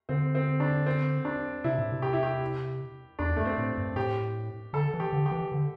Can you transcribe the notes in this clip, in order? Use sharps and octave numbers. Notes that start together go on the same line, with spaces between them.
D3 C4
C4
D4
C4
D4
C3 E4
A2
C3
G4
E4
G4
E2 D4
G2 A3
C4
A2
G2
A2 G4
D3 A4
E3
G4
D3
G4
E3
D3